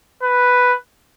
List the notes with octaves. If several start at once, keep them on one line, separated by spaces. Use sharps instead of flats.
B4